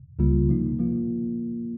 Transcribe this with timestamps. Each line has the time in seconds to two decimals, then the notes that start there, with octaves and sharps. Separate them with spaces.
0.19 C#2 C#3 G3 A#3 F4
0.48 C3 F3 A#3 D#4
0.79 F3 A#3 F4